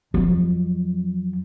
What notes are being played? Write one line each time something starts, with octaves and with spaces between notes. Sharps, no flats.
F2 F#3